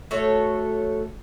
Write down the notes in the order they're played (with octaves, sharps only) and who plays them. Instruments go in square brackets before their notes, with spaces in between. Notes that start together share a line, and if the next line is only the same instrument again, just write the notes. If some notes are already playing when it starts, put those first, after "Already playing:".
[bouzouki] A3 F#4 A4 C#5